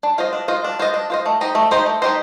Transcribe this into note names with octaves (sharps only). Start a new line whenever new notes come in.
D4
F4 C5 D#5
D4
F4 C5 D#5
D4
F4 C5 D#5
D4
F4 C5 D#5
A3
D#4 G4 C5 D#5
A3
D#4 G4 C5 D#5
A3
D#4 G4 C5 D#5